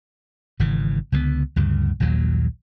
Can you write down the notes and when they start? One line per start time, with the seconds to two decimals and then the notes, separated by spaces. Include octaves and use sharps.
0.59 G#1 C#3 E3
1.12 C#2 D3 F3 B3
1.56 D2 G2 C#3
2.00 A#1 D#2 A#2 F#3